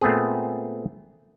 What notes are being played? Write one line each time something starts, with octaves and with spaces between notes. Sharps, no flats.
A#2 A3 B3 C4 G#4